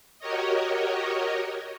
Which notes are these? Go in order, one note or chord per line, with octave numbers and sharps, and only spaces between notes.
F#4 G4 A#4 C#5 D#5